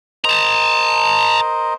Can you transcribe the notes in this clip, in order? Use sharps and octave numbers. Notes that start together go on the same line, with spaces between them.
A#4 C5 D#5 A5 A#5